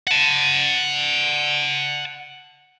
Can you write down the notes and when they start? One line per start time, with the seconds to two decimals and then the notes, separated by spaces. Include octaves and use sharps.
0.07 F#5 A5